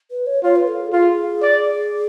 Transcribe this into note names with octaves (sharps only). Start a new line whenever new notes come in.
B4
C#5
F4 C#5
B4
A4
G#4
F4 G#4
D5